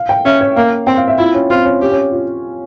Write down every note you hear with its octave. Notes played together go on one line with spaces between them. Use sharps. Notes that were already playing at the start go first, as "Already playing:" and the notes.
Already playing: F5
G5
C#4 E5
C#5
A#3 F5
C4 G5
F5
E5
E4 F4
C#4
C4 F4
C#4
C#4 G4
C#4
F4